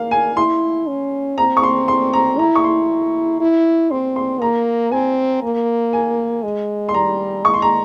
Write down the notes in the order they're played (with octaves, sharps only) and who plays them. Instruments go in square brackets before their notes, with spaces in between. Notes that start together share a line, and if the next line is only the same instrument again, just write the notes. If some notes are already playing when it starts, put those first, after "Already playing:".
Already playing: [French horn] A#3 [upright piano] F5
[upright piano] G#5
[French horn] E4 [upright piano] C6
[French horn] C#4
[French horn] C4 [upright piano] A#5
[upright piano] C#6
C6
C6
A#5
[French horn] E4 [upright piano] A#5
[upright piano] C#6
C6
[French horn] E4
[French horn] C4 [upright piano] C6
[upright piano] C6
[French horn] A#3 [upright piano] A#5
[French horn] C4 [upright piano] G#5
[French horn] A#3
[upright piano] G#5
[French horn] G#3
[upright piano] C6
[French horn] G3 [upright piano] A#5
[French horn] G#3 [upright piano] C#6
[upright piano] C6
A#5